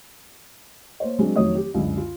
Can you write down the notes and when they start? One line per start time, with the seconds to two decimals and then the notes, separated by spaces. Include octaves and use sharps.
1.00 A#3 C5 C#5
1.19 F#3 G#3 C4 D4
1.36 F1 D#3 F#3 A3 C#5 D#6
1.55 G4
1.74 C#2 F#2 D3
1.97 F4